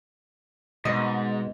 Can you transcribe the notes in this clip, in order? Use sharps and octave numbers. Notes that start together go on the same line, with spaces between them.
G#2 B2 D#5